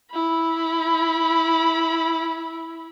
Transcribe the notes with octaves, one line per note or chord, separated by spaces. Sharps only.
E4 B5